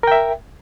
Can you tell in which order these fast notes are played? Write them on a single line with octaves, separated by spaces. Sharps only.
A#4 G5 E5